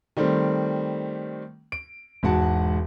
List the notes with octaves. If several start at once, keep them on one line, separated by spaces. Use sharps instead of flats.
D#3 G3 A3 C4
D7
E1 G#2 F#4 F#5 A5